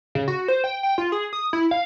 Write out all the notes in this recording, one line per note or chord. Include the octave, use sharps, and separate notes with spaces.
C#3
F#4
C5
G5
G5
F4
G#4
D#6
E4
F5